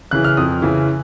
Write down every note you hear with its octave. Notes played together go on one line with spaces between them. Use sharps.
C#3 E3 F#6
F6
F2 D#6
C#3 E3